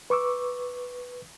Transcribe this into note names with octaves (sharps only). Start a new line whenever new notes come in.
B4 C#6 D6 E6